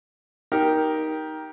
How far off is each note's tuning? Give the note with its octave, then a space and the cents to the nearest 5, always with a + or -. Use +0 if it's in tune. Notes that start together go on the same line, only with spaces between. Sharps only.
D#4 +10 G4 +0 A#4 +10